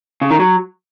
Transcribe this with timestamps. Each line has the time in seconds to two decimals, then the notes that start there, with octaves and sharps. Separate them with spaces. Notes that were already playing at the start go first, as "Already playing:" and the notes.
0.22 C#3
0.31 D#3
0.40 F#3